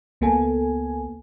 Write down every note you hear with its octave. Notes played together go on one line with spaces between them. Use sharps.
C#2 A#3 B3 A4 G#5